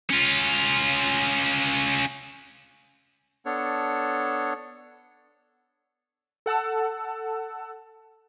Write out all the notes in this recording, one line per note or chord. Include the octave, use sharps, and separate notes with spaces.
C#4 F4
B3 D4 A4 C#5
A4 F#5 A5 E6